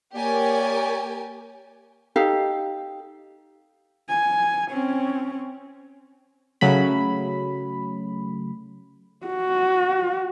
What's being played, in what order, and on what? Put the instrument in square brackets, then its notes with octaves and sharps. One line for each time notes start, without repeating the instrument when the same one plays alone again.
[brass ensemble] A#3 C#5 D5 [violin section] G4 A#4 G#5
[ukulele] D#4 G4 A4 F5
[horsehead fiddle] G#5
C4 C#4
[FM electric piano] C#3 F#3 A3 B5
[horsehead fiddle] F#4